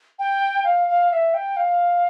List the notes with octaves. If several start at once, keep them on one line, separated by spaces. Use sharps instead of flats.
G5
F5
F5
E5
G5
F5